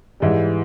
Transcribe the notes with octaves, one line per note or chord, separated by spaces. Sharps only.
G#2 E3 G3